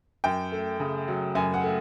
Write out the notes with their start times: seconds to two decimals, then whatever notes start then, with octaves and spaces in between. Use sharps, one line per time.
0.24 F#2 G5
0.52 A3
0.80 C#3
1.08 F#3
1.35 F#2 G#5
1.54 F#5
1.64 A3